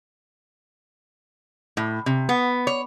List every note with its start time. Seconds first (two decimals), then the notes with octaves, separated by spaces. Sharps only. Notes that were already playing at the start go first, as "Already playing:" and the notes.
1.77 A2
2.06 C3
2.29 B3
2.67 C#5